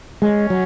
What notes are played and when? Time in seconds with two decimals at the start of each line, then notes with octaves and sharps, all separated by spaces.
0.22 G#3 C#4
0.50 F#3